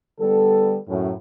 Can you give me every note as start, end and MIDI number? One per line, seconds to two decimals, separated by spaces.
0.19 0.77 50
0.19 0.77 55
0.19 0.77 59
0.19 0.77 69
0.89 1.11 42
0.89 1.11 45